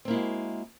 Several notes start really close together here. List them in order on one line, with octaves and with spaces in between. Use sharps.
C4 A#3 E4 G#3 F#4